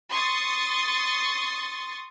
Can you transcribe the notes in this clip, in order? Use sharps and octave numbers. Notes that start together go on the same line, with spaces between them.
C6 C#6 D#6 A6